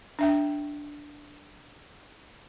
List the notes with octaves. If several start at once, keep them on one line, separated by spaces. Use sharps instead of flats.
D4 E5 G5